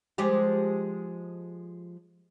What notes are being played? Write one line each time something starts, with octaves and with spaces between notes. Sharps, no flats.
F3 G#3 G4